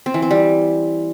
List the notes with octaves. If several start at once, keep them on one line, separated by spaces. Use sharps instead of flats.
C4
E3
C4
G3